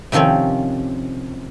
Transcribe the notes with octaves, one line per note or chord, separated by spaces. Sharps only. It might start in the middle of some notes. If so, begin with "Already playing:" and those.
C3 D#3 F3 C4 C#4